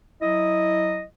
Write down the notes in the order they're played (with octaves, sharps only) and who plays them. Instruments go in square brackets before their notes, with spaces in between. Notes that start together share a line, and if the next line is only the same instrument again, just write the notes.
[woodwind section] F#3 E4 D#5